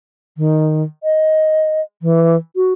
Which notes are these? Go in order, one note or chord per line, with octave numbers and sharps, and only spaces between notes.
D#3
D#5
E3
F#4